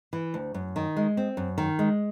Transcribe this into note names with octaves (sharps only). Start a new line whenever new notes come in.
E3
D2
F#2
D#3
G#3
C4
F#2
D#3
G#3